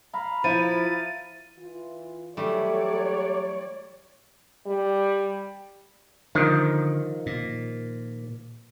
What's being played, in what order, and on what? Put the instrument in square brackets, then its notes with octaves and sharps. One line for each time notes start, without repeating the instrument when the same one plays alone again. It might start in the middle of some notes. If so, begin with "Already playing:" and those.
[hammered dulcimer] F5 A#5 B5
[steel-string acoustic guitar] F3 [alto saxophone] E4 [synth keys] A6 D#7
[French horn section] E3 F4
[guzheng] E3 G3 A3 [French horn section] F#3 G4 [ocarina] A4 [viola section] C#5 D5
[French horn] G3
[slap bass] D3 [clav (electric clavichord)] D#3 F3
[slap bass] A#2